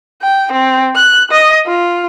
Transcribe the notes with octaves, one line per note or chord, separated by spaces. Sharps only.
G5
C4
F#6
D#5
F4